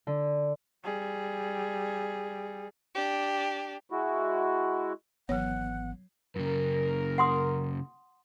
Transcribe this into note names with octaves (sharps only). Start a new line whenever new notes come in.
D3
G3 G#4
D4 G4
G#3 E4 F#4
G#1 E3 F#3 B3 C#5 F#5
F#2 C#3 A#4
F#5 C6 D#6